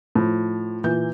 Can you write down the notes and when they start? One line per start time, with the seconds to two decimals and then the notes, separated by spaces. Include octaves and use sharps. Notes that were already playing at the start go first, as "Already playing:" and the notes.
0.15 A2 F3
0.84 A#2 E3 G6